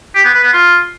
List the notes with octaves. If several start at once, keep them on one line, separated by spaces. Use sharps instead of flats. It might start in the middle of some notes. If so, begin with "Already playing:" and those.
G4
B3
B4
B3
F4